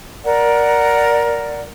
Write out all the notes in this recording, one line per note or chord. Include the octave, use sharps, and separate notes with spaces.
A#4 D5 F#5